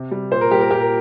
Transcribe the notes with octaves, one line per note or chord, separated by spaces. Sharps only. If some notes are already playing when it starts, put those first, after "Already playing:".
Already playing: C3
G3
A#2 C5
A#4
G3 G4
A#4
A#2 G4
A#4